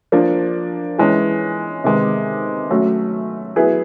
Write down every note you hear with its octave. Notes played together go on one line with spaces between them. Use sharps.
F3 A#3 D4
E3 G#3 C#4
C3 D#3 G#3 B3
F#3 A3 C#4
F#3 B3 E4 G#4 B4